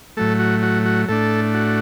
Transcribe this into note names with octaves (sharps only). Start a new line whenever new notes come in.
A2 F#3 A3 A4
F#4
F#4
F#4
A2 A3 D4 A4
F#4